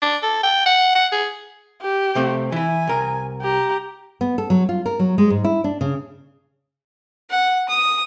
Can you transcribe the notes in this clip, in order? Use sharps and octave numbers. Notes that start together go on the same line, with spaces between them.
D4
A4
G5
F#5
F#5
G#4
G4
C3 A3 C4
E3 E4 G#5
C2 A#4
G4 A#5
B3
A4
F#3
F4
A#4
F#3
G#3
G#2
E4
D4
C#3
F#5
D#6